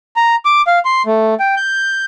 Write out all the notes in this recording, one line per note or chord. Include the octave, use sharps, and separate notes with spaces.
A#5
D6
F5
C6
A3
G5
G6